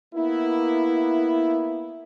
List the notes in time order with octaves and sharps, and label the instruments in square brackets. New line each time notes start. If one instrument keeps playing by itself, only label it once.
[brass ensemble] A#3 B3 E4